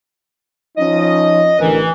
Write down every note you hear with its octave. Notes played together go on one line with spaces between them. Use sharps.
F3 C#4 D#4 D#5
A1 D3 E3 A#4